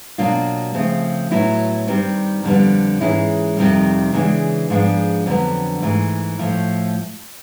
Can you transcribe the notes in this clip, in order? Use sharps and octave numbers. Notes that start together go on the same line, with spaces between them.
B2 F#3 A#3 D4 F4
C#3 F3 A3 C4
A2 F#3 B3 E4
G2 D#3 G3 C4
F2 D3 G3 B3
G#2 E3 G#3 C#4 E4
F2 C3 D#3 G3
C#3 E3 G#3 B3 D4
G#2 F3 G#3 B3 D4
F2 D3 F#3 B3
G#2 E3 A3
A2 F3 A3